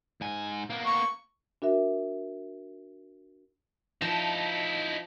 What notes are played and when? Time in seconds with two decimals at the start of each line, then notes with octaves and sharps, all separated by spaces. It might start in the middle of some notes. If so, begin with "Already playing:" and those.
0.21 G#2 G#5
0.70 A#3 B3
0.86 C#6
1.62 D4 F#4 A#4 E5
4.01 F3 D#4 E4 A5